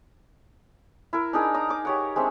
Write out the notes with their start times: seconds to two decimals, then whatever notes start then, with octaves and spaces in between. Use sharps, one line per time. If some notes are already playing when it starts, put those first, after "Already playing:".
1.13 E4 A#4
1.33 D4 D#4 G#4 A#4
1.54 A#5 D#6
1.69 D#4 D6
1.85 G4 C#5 F#5
2.16 G#3 C4 D4 E5